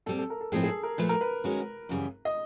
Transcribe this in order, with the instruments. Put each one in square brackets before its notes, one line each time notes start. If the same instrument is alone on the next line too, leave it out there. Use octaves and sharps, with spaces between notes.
[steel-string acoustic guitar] A#2 G3 C4 [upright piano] A4
[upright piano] A4
A#4
A4
[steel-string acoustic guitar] A2 F3 G#3 C4 E4 [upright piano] G#4
[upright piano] G#4
A4
A#4
[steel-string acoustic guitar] A#2 F3 A3 [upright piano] B4
[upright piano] A#4
B4
[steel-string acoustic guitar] D#3 G#3 C#4 F#4
F#2 C#3 E3 G3
[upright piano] D#5